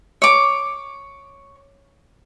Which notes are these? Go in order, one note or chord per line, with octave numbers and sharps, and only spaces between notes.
C#5 D6